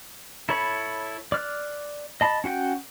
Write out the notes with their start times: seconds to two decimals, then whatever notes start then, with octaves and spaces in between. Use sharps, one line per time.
0.49 E4 A4 C#5 B5
1.32 D5 F6 F#6
2.21 D#5 A5 B5
2.44 C#4 F#4 F#5 G5